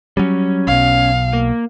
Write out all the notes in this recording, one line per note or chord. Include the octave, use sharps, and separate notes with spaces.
F#3 G3 C#4
B1 B2 F5
A#3